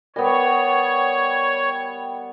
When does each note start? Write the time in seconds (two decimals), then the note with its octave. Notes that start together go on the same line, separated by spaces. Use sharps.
0.16 G3 B3 A#4 C#5 G5